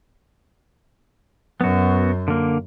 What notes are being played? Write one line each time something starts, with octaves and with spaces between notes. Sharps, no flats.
F#2 B3 F#4
D3 A#3